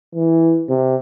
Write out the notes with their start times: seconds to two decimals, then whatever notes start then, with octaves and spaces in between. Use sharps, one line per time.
0.14 E3
0.69 C3